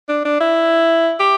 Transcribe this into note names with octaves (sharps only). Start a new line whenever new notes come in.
D4
D4
E4
G4